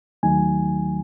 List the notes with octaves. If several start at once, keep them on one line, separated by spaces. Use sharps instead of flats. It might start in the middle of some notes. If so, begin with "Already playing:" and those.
D#2 D#3 F#3 A3 D#4 G#5